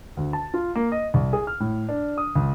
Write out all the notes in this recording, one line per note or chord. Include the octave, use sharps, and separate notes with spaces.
D2
A5
F4
A#3
D#5
C2
G#4
F6
A2
D4
D#6
C#2